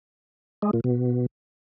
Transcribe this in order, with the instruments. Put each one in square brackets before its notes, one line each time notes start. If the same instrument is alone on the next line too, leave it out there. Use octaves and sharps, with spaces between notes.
[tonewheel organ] G#3
A#2
B2